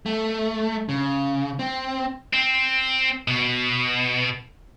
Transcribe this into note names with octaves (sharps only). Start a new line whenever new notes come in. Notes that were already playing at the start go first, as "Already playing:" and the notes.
A3
C#3
C4
C4
B2